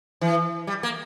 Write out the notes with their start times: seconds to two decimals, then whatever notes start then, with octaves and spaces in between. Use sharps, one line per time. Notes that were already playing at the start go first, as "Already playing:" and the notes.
0.21 E3
0.67 G3
0.83 A#3